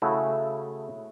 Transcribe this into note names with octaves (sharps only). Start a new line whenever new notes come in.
C#3 A3 E4 F#4